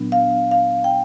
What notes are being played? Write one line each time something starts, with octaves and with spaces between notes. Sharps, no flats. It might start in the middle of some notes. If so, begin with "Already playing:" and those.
Already playing: A#2 F#3 B3 D4
F5
F5
G5